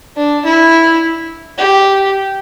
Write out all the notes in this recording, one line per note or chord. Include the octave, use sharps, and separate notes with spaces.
D4
E4
G4